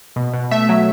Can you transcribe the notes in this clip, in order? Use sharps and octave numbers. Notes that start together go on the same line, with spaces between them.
B2
B2
A3 E5
F#3